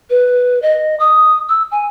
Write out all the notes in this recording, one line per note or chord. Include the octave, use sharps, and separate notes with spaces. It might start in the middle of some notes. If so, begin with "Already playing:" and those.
B4
D#5
D#6
E6
G#5